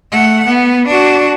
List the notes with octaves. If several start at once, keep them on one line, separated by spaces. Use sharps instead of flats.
A3 F#5
B3
D4 F#4